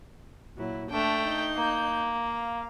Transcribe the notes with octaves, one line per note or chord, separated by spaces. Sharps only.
A#2 F#3 E4
A3 D4 A4 G5
D#4 G6
A#3
F5